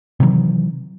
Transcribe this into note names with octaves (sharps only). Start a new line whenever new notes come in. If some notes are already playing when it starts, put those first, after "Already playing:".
C3 D#3 E3 F#3